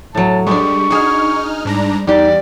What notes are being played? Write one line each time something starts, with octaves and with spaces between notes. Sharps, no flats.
A2 F#3 A5
G3 G#3 D4 C#6
D#4 F#4 G#4 F6
G#2 G3 D4 A#5
E2 G3 D#4 G4 D5